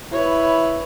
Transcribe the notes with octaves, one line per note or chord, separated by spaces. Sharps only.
E4 B4 C#5